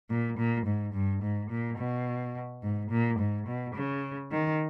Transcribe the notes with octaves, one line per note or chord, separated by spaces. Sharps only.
A#2
A#2
G#2
G2
G#2
A#2
B2
G#2
A#2
G#2
B2
C#3
D#3